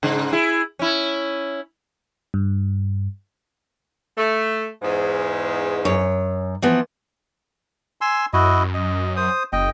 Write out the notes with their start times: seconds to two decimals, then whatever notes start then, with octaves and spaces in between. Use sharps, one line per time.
0.03 G#2 C#3
0.33 E4 G#4
0.79 C#4 E4
2.34 G2
4.17 A3
4.82 E2 G#2
5.85 F#2 C#5
6.62 E3 F3 B3
8.01 G#5 C6 E6
8.33 F#2 E4 F#4 D#5
8.74 D#5
9.16 C5 D#6
9.53 F#1 D#5 G5